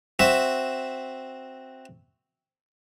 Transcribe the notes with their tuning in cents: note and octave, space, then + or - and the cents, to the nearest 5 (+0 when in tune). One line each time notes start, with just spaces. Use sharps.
C4 +0 F#4 +0 E5 +0